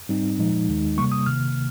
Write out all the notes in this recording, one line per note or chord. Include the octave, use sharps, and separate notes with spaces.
G#2 G3 C4 D#4
A#2 F3 G#3 D#4
D#2 D#3 G#3 D#4
C3 G3 A#3 C#6
D#6
C3 D#3 A#3 F6